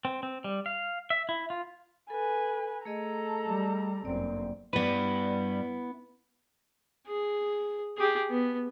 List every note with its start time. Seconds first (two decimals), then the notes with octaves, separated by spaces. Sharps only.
0.05 C4
0.23 C4
0.44 G3
0.66 F5
1.10 E5
1.29 E4
1.50 F4
2.10 A4 B4 G#5
2.85 A3 G#4 A4 D#5 A#5
3.46 G3
4.05 G1 F#2 A#3 C4 D5
4.73 G2 G3 B3 E4 B4
7.07 G#4
7.97 G4 G#4
8.30 B3